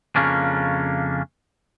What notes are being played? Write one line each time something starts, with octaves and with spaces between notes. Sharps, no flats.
F2 C#3 A#3 C#4 D4